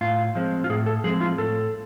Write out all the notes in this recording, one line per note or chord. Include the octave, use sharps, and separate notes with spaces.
A2 F4
F3 G#3 C4
F4
A2 G#4
A4
F3 G#3 C4 G#4
F4
A2 A4